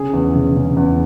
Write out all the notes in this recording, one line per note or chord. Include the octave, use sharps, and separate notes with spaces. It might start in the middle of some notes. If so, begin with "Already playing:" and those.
Already playing: C#3 G#4
E2
C#3
C#3
E2